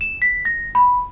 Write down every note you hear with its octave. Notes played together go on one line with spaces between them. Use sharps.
E7
B6
A#6
B5